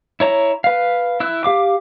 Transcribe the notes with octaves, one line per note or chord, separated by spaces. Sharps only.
E4 C#5 A#5
B4 F5
E4 E6 F#6
G4 F5 D6